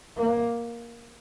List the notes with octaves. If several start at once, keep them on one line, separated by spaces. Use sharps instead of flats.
A#3